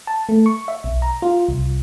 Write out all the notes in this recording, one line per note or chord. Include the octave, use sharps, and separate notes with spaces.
A5
A3
C#6
E5
B1
A#5
F4
C2